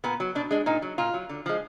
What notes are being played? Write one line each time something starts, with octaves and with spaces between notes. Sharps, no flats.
A#2 B3
F#3
B2 D4
G#3 D4
A#2 D#4
F#3
A#2 F4
F#3
D3
F3 G#3